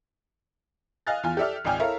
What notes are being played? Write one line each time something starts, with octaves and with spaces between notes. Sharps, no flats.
D#5 F5 G#5 F6 F#6 A6
E2 F4 G#5
G4 A4 D5 E5 F6
G#1 C#2 D5 G5 G#5 F6
E4 A4 A#4 C#5 E5 F5